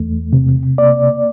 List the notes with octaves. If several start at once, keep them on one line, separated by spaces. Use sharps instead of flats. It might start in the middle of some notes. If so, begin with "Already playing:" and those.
Already playing: E2 A3
C3
A#3 D5